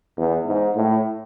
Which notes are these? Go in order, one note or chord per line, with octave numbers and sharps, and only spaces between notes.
E2
G#2
A2